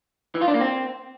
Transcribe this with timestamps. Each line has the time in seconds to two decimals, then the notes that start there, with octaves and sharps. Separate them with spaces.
0.35 E3
0.41 F4
0.48 D4
0.54 A#3
0.61 C4